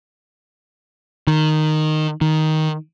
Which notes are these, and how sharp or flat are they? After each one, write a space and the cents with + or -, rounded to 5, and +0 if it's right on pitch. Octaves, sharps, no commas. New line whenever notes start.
D#3 -10
D#3 +5